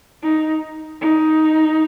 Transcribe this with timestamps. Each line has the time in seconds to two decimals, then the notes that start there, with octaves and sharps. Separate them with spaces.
0.23 D#4
1.01 D#4